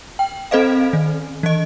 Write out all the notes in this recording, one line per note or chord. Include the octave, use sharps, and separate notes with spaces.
G5
C4 A4 C5 D#5 F5
D#3
E3 D#5